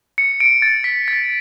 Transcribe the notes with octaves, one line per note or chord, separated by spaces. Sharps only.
C#7
D7
A6
B6
A6